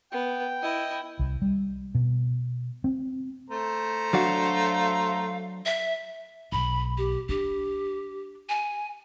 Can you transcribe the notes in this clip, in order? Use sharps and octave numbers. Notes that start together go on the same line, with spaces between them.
B3 G5
E4 D#5
C2
G3
B2
C4
A3 C5 A#5
F#3 D4 F#4 F5
E5
B1 B5
G4
D4 G4
G#5